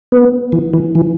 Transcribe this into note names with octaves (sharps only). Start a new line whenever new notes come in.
B3
E3
E3
E3